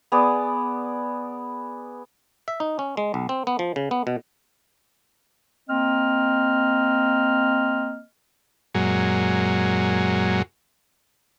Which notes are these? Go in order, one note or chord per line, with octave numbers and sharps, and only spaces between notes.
B3 G#4 D5
E5
D#4
C#4
G#3
B1
C4
B3
F3
C#3
B3
B2
A#3 C4 D#5 F6
F#2 A#2 F#3 G#3